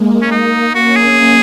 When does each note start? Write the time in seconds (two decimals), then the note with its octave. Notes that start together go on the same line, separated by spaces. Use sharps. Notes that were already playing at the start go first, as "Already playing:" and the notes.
Already playing: G#3 A#3
0.22 C#4
0.31 A#3 D#4
0.75 C#4 F#4
0.96 G#4